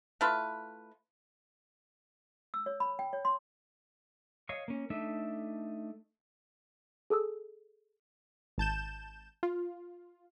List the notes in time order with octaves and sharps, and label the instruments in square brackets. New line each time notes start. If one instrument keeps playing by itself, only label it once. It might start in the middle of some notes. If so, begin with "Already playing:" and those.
[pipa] A3 E4 F4 B4
[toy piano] E6
C#5
B5
G5
C#5
C6
[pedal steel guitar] C#5 D#5 F5 C#6
A#3 C#4
A3 D4 D#4 E5
[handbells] G#4 A4 D#6 E6
[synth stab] G#1 A5 G6 E7
F4